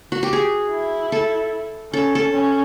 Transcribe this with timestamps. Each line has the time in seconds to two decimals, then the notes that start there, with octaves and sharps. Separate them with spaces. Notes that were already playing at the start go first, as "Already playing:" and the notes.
0.12 F#4
0.23 G4
0.33 G#4
0.72 E4
1.12 A4
1.93 C#4 A4
2.15 A4
2.33 C#4